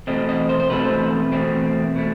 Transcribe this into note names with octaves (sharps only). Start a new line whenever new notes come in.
E2 B2 A3 C4 D#5
D#5
C5
C5
E2 B2 A3 C4 B4
E2 B2 A3 C4
B2 A3